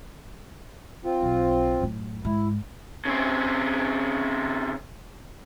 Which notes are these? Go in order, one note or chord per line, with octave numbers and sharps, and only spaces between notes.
C4 F4
B1
F#2 A2
G#2 E4
C#3 C4